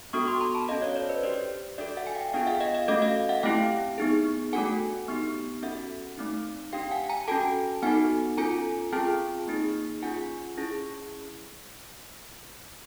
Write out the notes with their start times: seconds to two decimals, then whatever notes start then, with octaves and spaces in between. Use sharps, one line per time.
0.13 B3 D4 F#4 A4 C#6 D#6
0.27 C6 D6
0.41 A#5 C6
0.55 A5 B5
0.68 C#4 F#4 A4 D#5 F5
0.82 C#5 D#5
0.96 C5 D5
1.09 B4 C#5
1.23 D4 G4 C5 D5
1.78 D4 F#4 A4 D5 E5
1.97 E5 F#5
2.07 G#5
2.15 F5 G5
2.33 B3 D4 F4 G#4 F5 G5
2.47 E5 F#5
2.61 D#5 F5
2.74 D#5 F5
2.88 A3 C#4 F#4 A4 D#5 F5
3.02 D#5 F5
3.29 E5 F#5
3.43 A3 C4 E4 G4 F5 G5
3.98 B3 D#4 G#4
4.53 A3 D4 F#4 A4 F#5 G#5
5.08 B3 D#4 G4
5.63 C#4 F#4 A4 E5 F#5
6.18 A3 C4 D#4
6.73 D4 G4 F5 G5
6.91 F#5 G#5
7.09 G#5 A#5
7.28 C#4 F#4 A4 G5 A5
7.82 B3 D#4 F#4 A4 F#5 G#5
8.38 C#4 F4 A4 G#5 A#5
8.92 C4 F4 G#4 G5 A5
9.47 A#3 D#4 G#4
10.02 C#4 F4 G#4 F#5 G#5
10.57 C#4 E4 G#4